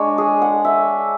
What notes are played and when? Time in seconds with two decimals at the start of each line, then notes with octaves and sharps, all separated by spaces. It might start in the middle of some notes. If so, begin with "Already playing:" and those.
Already playing: G#3 D4 C#5
0.18 G#4
0.42 F#5
0.65 E5